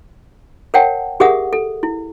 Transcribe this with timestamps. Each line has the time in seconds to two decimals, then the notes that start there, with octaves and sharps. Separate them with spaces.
0.74 A#4 C#5 F#5 G5 A5
1.20 G4 G#4 A#4 E5 F#5 D#6
1.53 A4
1.83 E4